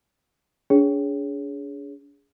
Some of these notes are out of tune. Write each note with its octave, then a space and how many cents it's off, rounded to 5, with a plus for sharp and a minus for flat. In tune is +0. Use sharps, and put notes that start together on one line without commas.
D4 -40 G#4 +0 C#5 +0